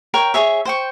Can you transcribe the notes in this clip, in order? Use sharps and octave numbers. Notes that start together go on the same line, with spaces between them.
A#4 C#5 G5
G#4 C#5 E5
C5 G5 C#6